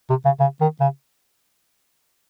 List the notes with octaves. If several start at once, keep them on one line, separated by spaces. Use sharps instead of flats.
C3
C#3
C#3
D#3
C#3